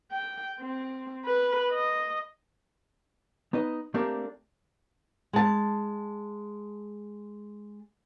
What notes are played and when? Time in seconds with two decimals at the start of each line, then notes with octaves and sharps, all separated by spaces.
0.12 G5
0.61 C4
1.25 B4
1.71 D#5
3.53 B3 D#4 B4 D#5
3.94 A3 A#3 C4 D4 G4 A#4
5.33 G#3 A5